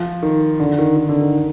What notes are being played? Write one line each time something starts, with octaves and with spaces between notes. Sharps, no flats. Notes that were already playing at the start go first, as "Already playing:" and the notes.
Already playing: F3
D#3
D3
D#3
D#3
D3
D#3